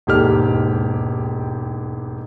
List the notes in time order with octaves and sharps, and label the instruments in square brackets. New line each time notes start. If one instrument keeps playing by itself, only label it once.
[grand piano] E1 D#2 G#2 G4 A4 F6